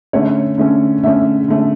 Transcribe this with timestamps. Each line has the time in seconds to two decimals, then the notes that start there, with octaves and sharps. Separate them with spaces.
0.13 D3 A3 C#4 C#5
0.58 D3 A3 C#4
1.03 D3 A3 C#4 E5
1.48 D3 A3 C#4